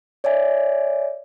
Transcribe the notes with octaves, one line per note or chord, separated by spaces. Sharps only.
C#5 D5 E5 G#5